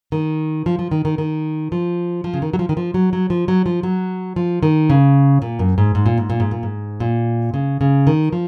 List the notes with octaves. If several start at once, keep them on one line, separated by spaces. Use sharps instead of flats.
D#3
F3
F3
D#3
D#3
D#3
F3
F3
C#3
D#3
F#3
F3
D#3
F3
F#3
F#3
F3
F#3
F3
F#3
F3
D#3
C#3
A#2
F#2
G#2
G#2
A#2
G#2
A#2
G#2
A#2
G#2
A#2
C#3
C#3
D#3
F3